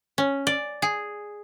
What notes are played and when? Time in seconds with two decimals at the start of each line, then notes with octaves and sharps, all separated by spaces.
0.18 C#4
0.47 D5
0.82 G#4